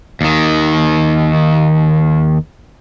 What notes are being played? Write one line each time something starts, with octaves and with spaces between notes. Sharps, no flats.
D#2 D#3